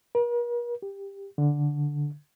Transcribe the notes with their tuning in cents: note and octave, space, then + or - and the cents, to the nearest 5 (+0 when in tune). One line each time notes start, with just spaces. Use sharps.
A#4 +45
G4 +15
D3 -5